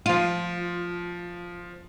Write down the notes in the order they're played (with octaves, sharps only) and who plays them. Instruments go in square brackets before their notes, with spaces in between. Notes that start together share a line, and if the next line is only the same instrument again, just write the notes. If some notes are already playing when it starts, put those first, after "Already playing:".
[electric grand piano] F3 D#7 [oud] F4